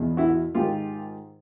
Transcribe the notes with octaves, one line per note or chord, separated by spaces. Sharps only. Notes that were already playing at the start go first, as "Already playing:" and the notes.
Already playing: E2 B2
E4 F#4
G#2 D#3 F4 G4